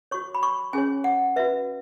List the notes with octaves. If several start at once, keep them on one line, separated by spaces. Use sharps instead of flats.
F#4 C#5 C#6
B5
C#6
C#4 G#4 C#5 G#5
F#5
F#4 B4 E5